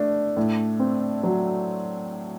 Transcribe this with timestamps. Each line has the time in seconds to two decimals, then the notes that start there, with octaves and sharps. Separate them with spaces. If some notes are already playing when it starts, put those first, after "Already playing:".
Already playing: A3 D4
0.37 A2
0.80 C4
1.23 F#3